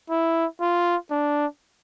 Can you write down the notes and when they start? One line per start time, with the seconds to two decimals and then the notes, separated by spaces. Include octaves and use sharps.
0.10 E4
0.61 F4
1.11 D4